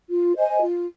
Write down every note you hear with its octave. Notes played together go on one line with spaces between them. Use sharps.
F4
C5 D#5 G#5
F4